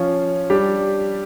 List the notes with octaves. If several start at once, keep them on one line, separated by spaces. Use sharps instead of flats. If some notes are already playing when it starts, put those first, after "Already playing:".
Already playing: F3 C#4 F4
G3 D4 G4